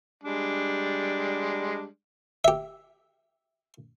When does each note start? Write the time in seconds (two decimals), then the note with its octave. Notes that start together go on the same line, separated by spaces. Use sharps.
0.24 G3 G#3 D4
2.44 G4 E5